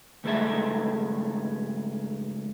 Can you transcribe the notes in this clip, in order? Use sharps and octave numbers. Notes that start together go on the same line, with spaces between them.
C#2 G2 A3 G#4 A4 E5